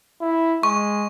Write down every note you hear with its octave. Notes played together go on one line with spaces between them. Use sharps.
E4
G#3 C#6